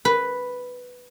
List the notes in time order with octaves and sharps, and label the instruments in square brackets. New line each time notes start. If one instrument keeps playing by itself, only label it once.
[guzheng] B4